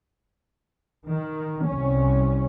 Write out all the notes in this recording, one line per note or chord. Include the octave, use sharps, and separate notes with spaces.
D#3
C2 C#4